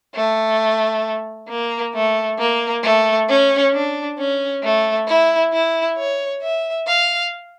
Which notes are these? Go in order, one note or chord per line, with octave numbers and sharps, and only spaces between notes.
A3
A#3
A3
A#3
A3
C#4
D4
C#4
A3
E4
E4
C#5
E5
F5